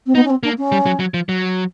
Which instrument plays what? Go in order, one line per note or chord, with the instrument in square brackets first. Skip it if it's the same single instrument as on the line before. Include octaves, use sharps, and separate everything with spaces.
[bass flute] C4
[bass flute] B3 [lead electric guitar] D#4
[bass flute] C#4
C4
[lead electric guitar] A#3 [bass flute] D4
[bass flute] C#4
[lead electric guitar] G3
F#3
F#3
F3
F#3